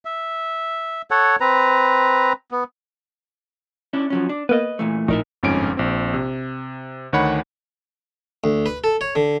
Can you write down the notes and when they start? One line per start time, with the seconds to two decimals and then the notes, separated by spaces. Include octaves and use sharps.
0.05 E5
1.11 A4 C#5 F#5
1.40 C4 B4 A#5
2.51 B3
3.93 C#4 D4 E4
4.10 F3 F#3 C#4
4.29 D4
4.49 A#3 B3 B4 D#5
4.79 A#2 E3 A3
5.08 A#1 A2 D#4 A#4 E5
5.43 G1 F2 G#2 C#4 G#5 D7
5.77 A#1 C4
6.14 C3
7.13 D2 D#3 C#5 F#5 B5
8.44 D2
8.66 B4
8.84 A4
9.01 C#5
9.15 D3